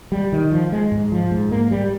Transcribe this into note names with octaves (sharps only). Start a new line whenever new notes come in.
G3
D#3
F3
G#3
G#2
F3
G#2
A#3
G3